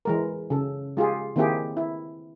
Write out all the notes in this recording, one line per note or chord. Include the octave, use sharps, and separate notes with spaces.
E3 G#3 A#4
C#3 A4
G#3 F4 G4 G#4
D#3 A#3 C4 E4 G4 G#4
E4